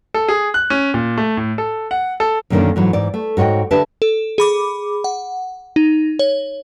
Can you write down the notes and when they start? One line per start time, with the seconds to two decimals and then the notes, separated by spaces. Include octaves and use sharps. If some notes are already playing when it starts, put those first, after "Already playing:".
0.14 A4
0.28 G#4
0.54 F#6
0.70 C#4
0.94 A#2
1.18 A3
1.37 A2
1.58 A4
1.91 F#5
2.20 A4
2.50 F#2 B2 D3 D#3 A#3 C#4
2.76 G#2 E3 F#3
2.93 G#2 E3 D5
3.14 A3
3.37 G#2 F#4 C#5 D#5 G5
3.71 D3 D4 G4 B4 E5 A5
4.02 A4
4.38 G#4 B5 D6
5.04 F#5
5.76 D#4
6.19 C#5